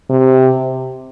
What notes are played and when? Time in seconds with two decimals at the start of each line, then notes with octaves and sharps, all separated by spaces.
0.10 C3